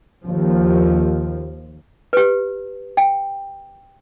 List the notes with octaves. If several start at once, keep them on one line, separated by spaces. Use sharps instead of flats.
D#2 F3
G4 B4
G5